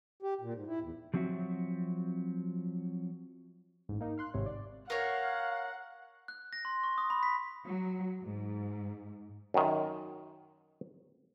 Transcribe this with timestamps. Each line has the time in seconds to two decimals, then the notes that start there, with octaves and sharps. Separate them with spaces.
0.23 G4
0.41 A#2
0.54 G#2
0.67 E4
0.82 E2
1.14 F3 F#3 C4 F#4 E5
3.89 A1 G#2
4.01 A#3 D#4
4.18 F5 C6 F#6
4.34 G#1 G#2 C3 C#5
4.46 D5
4.90 A#4 C#5 F5 F#5
6.28 F#6
6.53 A#6
6.65 C6
6.84 C#6
6.98 D#6
7.10 B5
7.23 B6
7.65 F#3
8.21 G#2
9.54 F#2 D#3